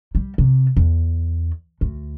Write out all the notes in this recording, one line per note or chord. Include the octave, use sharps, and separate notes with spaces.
G3
C3
E2
D2